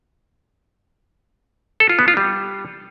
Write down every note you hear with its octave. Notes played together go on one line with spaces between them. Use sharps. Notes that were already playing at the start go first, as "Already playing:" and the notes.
A4
F4
B3
F4
G3